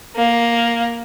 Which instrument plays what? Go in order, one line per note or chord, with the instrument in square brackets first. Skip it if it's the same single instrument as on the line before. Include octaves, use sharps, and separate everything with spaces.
[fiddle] A#3